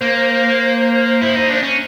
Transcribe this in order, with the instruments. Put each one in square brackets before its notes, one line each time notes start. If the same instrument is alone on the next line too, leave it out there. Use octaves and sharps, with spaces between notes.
[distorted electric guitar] A#3 [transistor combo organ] C5
[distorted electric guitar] E4
D#4
D4
C#4